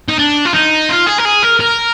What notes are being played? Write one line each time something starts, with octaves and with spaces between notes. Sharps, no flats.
D#4
D4
F4
D#4
F4
G#4
A#4
G#4
A#4
A#4